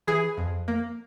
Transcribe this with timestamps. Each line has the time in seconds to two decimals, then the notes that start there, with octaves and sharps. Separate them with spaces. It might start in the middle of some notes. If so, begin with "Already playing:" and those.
0.07 E3 G#4
0.37 F2
0.68 A#3